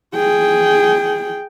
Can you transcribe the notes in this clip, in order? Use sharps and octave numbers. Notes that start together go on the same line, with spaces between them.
G#4 G5